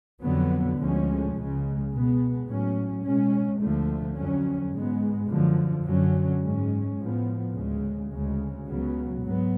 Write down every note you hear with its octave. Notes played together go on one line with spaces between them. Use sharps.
F2 D3 F#3 B3
D2 D3 F3 G#3 C#4
C#2 C#3 G#3
B2 G#3 B3
A2 F#3 C#4
B2 G#3 C#4
D2 D3 F3 A3
F2 D3 F#3 C#4
G#2 G#3 B3
F#2 D3 F3
F#2 D3 F#3 C#4
G#2 G#3 C#4
A2 F3 B3
D2 C#3 G#3
D2 C#3 G#3
C#2 C#3 F#3 B3
G#2 F#3 B3